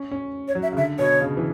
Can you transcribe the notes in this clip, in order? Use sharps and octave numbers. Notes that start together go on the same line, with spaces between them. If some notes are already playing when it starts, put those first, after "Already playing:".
Already playing: C#4
C#4
C#5
F#3
E5
C#3
D3 E5
B2 C#5
C#3
E3